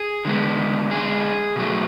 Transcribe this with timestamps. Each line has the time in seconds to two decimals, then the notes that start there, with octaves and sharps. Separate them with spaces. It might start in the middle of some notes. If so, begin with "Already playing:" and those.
Already playing: G#4
0.25 D3 G#3 B3
0.91 G#4
1.56 B2 F#3 A3